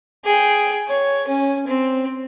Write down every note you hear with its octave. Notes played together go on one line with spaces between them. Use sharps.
G#4 G5
C#5
C#4
C4